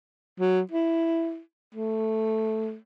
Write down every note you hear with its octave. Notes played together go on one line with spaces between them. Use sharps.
F#3
E4
A3